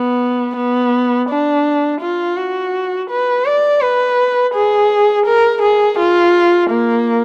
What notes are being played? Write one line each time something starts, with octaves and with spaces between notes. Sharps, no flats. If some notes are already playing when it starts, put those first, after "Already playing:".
Already playing: B3
B3
D4
F4
F#4
B4
D5
B4
G#4
A#4
G#4
F4
A#3